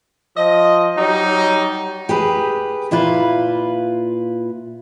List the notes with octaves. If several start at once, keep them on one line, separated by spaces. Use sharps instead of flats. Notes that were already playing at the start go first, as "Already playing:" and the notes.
F3 D#5
F#3 G3 D#4
G4 G#4 B4
A#2 E4 F4 B4